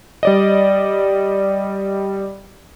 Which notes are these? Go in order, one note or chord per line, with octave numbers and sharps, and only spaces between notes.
G3 D5 D#5